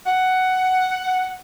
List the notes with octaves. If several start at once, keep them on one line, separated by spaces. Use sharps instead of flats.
F#5